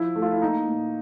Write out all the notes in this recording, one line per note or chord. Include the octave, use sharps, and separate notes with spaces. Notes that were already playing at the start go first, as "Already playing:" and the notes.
Already playing: F3 E4
A3
F4
E4
A#3 D#4
A#2